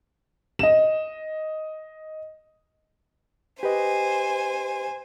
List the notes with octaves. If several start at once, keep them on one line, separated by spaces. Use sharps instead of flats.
D#5 E7
G4 B4 C5 D#5 G#5